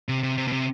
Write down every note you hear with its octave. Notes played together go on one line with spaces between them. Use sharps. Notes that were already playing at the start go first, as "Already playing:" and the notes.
C3
C3
C3
B2
C3